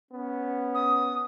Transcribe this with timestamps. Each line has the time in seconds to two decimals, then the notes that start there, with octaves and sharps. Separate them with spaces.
0.10 B3 C#4
0.75 D#6